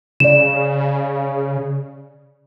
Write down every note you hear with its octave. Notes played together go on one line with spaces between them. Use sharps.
C#3 D5 E7